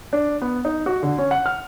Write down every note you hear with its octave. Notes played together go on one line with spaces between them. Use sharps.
D4
B3
D#4
F#4
D3
C#4
F#5
F6